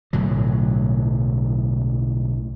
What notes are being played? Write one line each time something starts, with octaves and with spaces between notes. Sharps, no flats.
B1 A2 D3 F#3